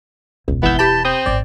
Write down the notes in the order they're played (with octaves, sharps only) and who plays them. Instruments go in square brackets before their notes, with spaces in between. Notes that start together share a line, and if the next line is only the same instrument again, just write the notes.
[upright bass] E1 [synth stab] C#2
[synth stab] G#1 E5 [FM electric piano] E3 G6 [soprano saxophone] B3
[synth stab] G4 B5 B6 [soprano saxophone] A5
[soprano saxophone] C4 [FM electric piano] D#6 G6
[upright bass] G#1 A2 [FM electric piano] D5